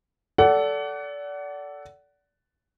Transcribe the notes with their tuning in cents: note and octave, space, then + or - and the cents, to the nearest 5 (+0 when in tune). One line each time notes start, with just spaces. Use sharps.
A4 +0 D5 -25 F#5 +20